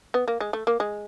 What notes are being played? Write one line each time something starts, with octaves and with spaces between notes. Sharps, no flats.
B3
A#3
G#3
A3
A#3
G#3